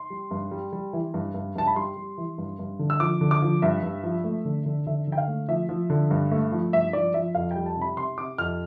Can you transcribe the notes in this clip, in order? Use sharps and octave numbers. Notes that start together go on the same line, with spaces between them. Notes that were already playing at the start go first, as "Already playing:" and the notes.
Already playing: C6
G3
G2
G3
G3
E3
G2
G2
G2 A5
B5
G3 C6
G3
E3
G2
G2
D3
E6
F3 D6
D3
D6
F3
G2 E5
G2
F3
A3
D3
D3
D3 E5
D3
G5
F5
A3
F3 E5
F3
D3
G2
A3
F3
G2 E5
F3 D5
F3 E5
F2 F5
G3 G5
A5
C3 B5
C3 C6
C3 D6
F2 F6